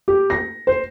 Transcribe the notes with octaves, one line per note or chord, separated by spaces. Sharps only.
G4
A#6
C5